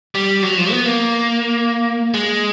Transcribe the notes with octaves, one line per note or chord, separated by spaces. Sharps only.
G3
F#3
F3
B3
A#3
G#3